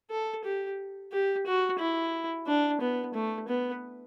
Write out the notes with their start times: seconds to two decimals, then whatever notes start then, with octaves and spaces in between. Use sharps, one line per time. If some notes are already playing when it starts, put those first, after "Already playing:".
0.10 A4
0.44 G4
1.12 G4
1.46 F#4
1.79 E4
2.47 D4
2.80 B3
3.14 A3
3.48 B3